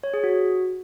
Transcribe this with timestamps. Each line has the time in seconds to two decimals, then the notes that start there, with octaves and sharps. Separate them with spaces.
0.03 C#5
0.14 G#4
0.24 F#4